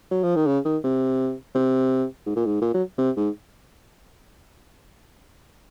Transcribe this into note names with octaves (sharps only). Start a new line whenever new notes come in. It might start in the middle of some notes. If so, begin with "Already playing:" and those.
F#3
F3
D#3
C#3
D#3
C3
C3
G#2
A#2
G#2
A#2
F#3
C3
G#2